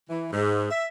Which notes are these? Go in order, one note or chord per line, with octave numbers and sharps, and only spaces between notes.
E3
G#2
E5